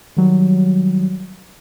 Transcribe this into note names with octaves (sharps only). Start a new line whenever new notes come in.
D#3 F#3 G3